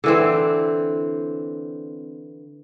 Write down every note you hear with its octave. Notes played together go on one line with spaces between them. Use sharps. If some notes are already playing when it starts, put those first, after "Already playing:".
D3 E3 C4